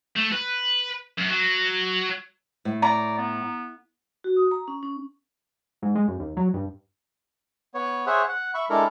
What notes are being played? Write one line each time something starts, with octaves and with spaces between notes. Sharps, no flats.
A3
B4
F#2
F#3
A2
D5 A#5
B3
F#4
D#6
A#5
C#4
C#4
G#2
G#3
F#2
D#2
F#3
G2
B3 C#5
G#4 C5 C#5 E5 F#5
F#5
E5 B5 C#6
G#3 D4 E4 A4 A#4